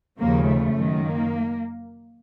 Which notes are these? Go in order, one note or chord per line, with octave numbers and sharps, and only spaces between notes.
D#2 C#3 F3 A#3
A3
F#2 D#3
A#3